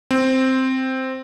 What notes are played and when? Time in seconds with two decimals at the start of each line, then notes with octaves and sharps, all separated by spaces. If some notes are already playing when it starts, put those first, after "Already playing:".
0.11 C4